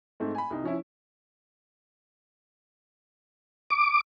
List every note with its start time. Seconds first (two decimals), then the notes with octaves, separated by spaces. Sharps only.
0.20 G#2 A3 C4
0.35 G#5 B5
0.50 C2 D#4
0.63 F3 C#4 E4
3.70 D6